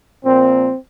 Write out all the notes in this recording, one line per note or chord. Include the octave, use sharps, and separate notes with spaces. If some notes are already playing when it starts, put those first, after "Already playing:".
A#2 F3 A#3 C4